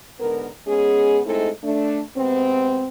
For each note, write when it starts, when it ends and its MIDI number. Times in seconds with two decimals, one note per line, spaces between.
0.20 0.49 44
0.20 0.49 50
0.20 0.49 59
0.20 0.49 70
0.67 1.20 56
0.67 1.20 59
0.67 1.20 61
0.67 1.20 68
1.25 1.50 56
1.25 1.50 57
1.25 1.50 60
1.25 1.50 63
1.25 1.50 64
1.25 1.50 69
1.64 2.01 57
1.64 2.01 62
2.17 2.88 48
2.17 2.88 56
2.17 2.88 59
2.17 2.88 60